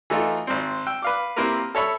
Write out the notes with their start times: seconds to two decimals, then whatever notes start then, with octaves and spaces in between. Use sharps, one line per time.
0.10 E3 A3 D#4 F4
0.47 G#1 C4
0.87 G5 E6
1.02 B4 F5 D6
1.36 A#3 C4 E4 G4 A#4 B4
1.75 A4 C#5 E5 B5 E6